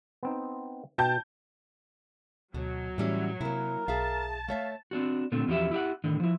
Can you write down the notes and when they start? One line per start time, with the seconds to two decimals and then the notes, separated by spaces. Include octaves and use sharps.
0.23 B3 C4 D#4
0.98 B2 G5 A5 G6
2.54 D2 B2 F#3
2.98 A2 E3 G3 C#4 E5
3.41 C3 A#3 E4 A#4
3.88 B1 G#4 E5 F5 A5
4.48 A3 C#5 E5 F5
4.91 C4 D4 F#4
5.32 A#2 D3 A3 C4
5.47 E2 F3 F#3 C#4 G4 E5
5.71 E4 G4 E5 F#5
6.04 A2 D3 D#3
6.20 F3 E4